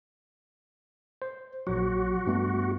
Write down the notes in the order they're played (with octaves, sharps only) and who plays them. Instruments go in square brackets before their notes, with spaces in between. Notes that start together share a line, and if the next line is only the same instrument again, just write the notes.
[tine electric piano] C5
[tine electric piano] A#1 F#3 [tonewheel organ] F#4
[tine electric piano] G2 A3 B3